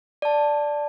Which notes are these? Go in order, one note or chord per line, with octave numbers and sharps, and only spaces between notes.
D5 A5